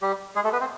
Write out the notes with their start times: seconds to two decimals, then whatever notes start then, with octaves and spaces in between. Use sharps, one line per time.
0.02 G3 G4
0.35 G#3 G#4
0.44 A3 A4
0.53 B3 B4
0.60 C4 C5